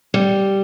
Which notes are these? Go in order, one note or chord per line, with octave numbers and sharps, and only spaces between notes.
G3